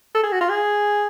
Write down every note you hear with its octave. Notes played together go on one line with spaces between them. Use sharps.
A4
G#4
F#4
F4
G#4